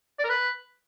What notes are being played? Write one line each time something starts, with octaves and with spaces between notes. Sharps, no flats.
D5
A#4
B4